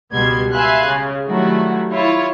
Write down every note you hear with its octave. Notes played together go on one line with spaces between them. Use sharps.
C#2 B2 G3 B3 C6 G#6
E5 F5 G#5 B5 C6 F#6
C#3
D#3 F#3 G3 A3 E4 F#4
E4 F4 C#5